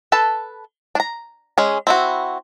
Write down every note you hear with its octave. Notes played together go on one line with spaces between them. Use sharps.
A4 B4 A5
D4 A#5
G#3 C#4 G#4
C4 E4 F#4